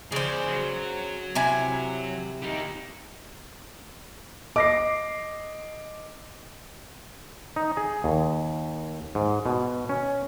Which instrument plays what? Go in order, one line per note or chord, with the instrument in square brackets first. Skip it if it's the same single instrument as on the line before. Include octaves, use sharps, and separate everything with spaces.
[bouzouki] C#3 C5 [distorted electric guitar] G#4 D5
[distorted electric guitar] F#3
[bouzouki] C3 E4 G#5
[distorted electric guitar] D#4 G4
[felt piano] D#5 A#6 C7 [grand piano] D6
[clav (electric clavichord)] D#4
G#4
D#2
G#2
B2
C#4